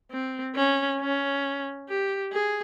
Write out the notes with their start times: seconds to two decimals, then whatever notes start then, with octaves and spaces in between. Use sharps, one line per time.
0.11 C4
0.56 C#4
1.00 C#4
1.89 G4
2.32 G#4